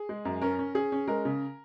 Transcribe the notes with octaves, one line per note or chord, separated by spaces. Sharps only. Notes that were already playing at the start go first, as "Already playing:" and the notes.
Already playing: G#4
G#3
F#2
C#4 A#4
C#4
C#4 G#4
C#4
G#3 A#4
C#3